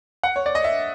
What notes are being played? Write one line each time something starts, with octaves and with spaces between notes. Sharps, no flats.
F#5
C#5
D5
D#5
E5